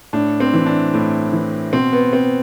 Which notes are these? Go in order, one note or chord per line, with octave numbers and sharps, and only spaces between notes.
A2 D4
C4
E3
D4
A2
E3
B2 C4
B3
C4